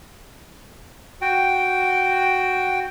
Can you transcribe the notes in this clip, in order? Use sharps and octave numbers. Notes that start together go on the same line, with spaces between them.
F#4 G5